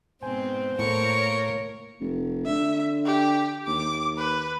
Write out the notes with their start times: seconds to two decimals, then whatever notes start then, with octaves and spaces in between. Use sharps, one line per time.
0.23 G#2 B2 C4 C5 G#5
0.79 A2 A#3 A#4 C#5 C#6
2.00 F1
2.46 D3 E5
3.06 G4
3.67 D#2 D6
4.18 B4